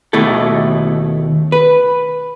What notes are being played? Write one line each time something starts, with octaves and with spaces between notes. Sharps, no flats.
D#2 B2 A3 E4 A4
B4